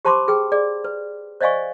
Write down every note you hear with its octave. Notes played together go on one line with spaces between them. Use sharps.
G4 C5 A5 B5 C6 D6
G#4 B4 G5
G#4 D5
B4
C5 D5 D#5 F5 G#5 C#6